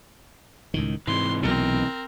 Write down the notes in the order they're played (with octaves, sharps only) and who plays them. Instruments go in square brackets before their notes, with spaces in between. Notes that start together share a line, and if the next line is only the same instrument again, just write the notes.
[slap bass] C#2 A2 D#3
[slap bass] G#2 [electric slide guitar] C3 E3 [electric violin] C6
[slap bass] B1 B2 [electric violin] C4 A#4